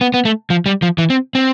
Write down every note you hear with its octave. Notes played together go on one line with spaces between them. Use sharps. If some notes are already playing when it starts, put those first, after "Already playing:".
B3
B3
A3
F3
G3
F3
E3
C4
C4